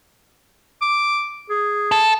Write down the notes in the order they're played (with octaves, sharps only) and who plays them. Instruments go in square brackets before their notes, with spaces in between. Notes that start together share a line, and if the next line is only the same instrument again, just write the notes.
[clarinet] D6
G#4
[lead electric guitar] A4